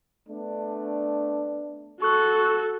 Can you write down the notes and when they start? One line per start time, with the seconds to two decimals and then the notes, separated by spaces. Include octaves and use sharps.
0.28 A3 B3 D4
2.02 F#4 A4 C#6 F#6